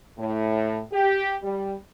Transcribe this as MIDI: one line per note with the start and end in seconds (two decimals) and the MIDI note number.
0.18 0.81 45
0.93 1.34 67
1.43 1.73 55